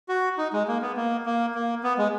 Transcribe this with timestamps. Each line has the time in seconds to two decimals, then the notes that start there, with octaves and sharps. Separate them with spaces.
0.09 F#4
0.38 D#4
0.53 G#3
0.68 A#3
0.82 B3
0.97 A#3
1.26 A#3
1.54 A#3
1.83 B3
1.98 G#3